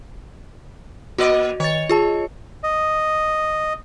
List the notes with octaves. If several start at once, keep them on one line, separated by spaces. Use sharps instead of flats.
A#3 F#4 D5 D#5
D#3 C#5 A6
F4 G#4 A5
D#5